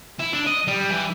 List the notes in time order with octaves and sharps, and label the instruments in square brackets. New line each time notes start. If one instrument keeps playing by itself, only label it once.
[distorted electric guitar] E4
D4
D#5
G3
E3